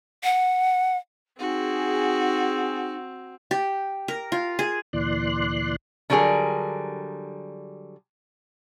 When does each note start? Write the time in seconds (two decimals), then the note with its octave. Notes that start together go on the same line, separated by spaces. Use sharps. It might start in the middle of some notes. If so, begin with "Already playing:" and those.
0.24 F#5
1.39 C4 D#4 F#4 G#4
3.51 G4
4.08 A#4
4.32 F4
4.59 G#4
4.93 D2 A#2 E3 D5 C6 F#6
6.10 D3 F#3 G3 F4 G#4 A#4